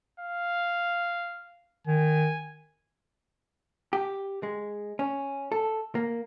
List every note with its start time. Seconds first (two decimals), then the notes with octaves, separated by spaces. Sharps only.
0.20 F5
1.87 D#3 G#5
3.93 G4
4.43 G#3
4.99 C#4
5.52 A4
5.95 A#3